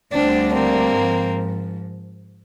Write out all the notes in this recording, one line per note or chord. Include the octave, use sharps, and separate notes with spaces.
D2 D3 G3 C4 D4
A#3 C4
G#2 F3